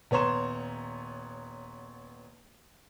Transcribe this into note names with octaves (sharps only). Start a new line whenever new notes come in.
D#1 B3 C#5 A#5 C6 E7